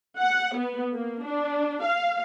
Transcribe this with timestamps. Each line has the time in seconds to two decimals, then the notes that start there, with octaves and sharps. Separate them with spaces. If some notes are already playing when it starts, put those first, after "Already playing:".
0.18 F#5
0.56 B3
0.93 A#3
1.23 D4
1.84 F5